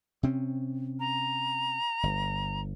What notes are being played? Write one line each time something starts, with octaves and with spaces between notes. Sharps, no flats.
C3 C4 C#4
A#5
G1